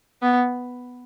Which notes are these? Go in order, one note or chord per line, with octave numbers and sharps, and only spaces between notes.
B3